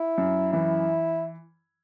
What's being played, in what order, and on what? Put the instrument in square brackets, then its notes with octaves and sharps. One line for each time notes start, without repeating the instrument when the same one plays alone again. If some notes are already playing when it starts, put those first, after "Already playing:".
Already playing: [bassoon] E4
[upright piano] F#2
[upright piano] E3 [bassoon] E4